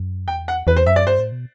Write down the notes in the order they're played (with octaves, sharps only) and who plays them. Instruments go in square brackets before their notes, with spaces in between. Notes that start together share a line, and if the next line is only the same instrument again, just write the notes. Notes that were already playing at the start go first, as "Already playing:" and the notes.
Already playing: [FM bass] F#2
[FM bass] E2 [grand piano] G5
[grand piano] F#5
[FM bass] E2 [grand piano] B4
[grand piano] C5
[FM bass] F#2 [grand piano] E5
[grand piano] D5
[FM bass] G2 [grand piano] C5
[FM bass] A2
B2